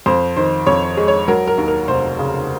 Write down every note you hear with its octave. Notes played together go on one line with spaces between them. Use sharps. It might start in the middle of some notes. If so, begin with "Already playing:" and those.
F2 C5
D#3 C5
F2 C#5
G#3
C#5
F#3 A#4
A#4
D#2
A#4
F1 C5
C#3